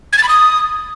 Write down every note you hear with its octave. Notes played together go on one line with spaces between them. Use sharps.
G#6
A6
B5
D#6